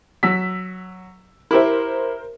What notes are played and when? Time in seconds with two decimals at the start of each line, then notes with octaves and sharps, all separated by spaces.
0.23 F#3 E6 B6
1.51 E4 G4 A#4 C5 E5